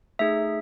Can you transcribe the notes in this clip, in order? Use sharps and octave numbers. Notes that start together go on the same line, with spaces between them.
A3 D#4 G#4 E5